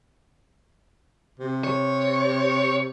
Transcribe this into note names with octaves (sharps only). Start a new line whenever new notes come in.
C3
C#5